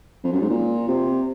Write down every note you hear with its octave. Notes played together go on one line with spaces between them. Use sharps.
F2
F#2
G#2
A#2
C3